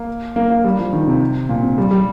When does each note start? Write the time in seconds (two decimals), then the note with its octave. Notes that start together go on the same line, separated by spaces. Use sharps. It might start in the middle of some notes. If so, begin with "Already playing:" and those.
Already playing: A#3
0.36 A#3
0.50 A#3
0.64 G3
0.79 F3
0.93 D#3
1.07 C3
1.49 A#2
1.63 C3
1.78 G3
1.91 G3